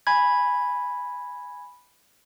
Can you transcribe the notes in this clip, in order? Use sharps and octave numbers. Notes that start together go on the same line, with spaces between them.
G#5 B5 G#6